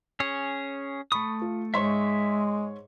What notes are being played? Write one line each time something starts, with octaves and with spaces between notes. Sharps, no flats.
C#4 G#4 C#5
A3 B5 C#6 D#6
F4
G#2 G#3 C#5 E5 C6 C#6